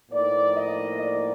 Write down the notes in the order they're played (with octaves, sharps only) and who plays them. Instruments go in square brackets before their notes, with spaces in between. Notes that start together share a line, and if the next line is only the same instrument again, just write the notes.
[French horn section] A2 F3 A#3 D#4 D5
D#5
D5